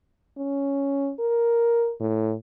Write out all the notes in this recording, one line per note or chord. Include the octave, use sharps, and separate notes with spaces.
C#4
A#4
A2